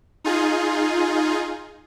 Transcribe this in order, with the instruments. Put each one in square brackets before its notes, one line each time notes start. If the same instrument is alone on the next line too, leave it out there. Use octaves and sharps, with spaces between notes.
[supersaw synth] D#4 F4 G#4